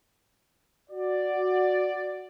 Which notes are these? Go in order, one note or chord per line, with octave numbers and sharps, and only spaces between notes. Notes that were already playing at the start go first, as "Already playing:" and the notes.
F#4 D5